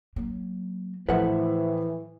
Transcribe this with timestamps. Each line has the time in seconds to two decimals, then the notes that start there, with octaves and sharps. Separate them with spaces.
0.16 F#3 A#3
1.09 A2 E3 F3 A3 B4 C5 E5 F#5